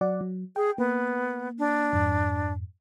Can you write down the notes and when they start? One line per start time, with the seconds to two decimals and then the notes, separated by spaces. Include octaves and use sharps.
0.01 F#3 D5 F#5
0.21 F#3
0.56 G#4 G5
0.78 A#3 B3
1.59 D4
1.92 F2 G#2